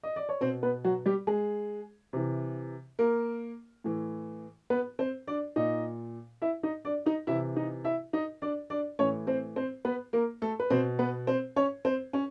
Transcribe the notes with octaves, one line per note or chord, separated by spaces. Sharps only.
D#5
D5
C#5
B2 C4 C5
B3 B4
F#3 F#4
G3 G4
G#3 G#4
C3 E3
A#3 A#4
A2 E3
B3 B4
C4 C5
D4 D5
A#2 D#4 D#5
E4 E5
D#4 D#5
D4 D5
D#4 D#5
C3 E3 E4 E5
D#4 D#5
E4 E5
D#4 D#5
D4 D5
D4 D5
A2 E3 C#4 C#5
C4 C5
C4 C5
B3 B4
A#3 A#4
A3 A4
B4
B2 C4 C5
B3 B4
C4 C5
C#4 C#5
C4 C5
C#4 C#5